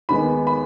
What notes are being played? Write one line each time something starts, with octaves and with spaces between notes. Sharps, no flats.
D#2 D#3 G#3 B3 B5
B5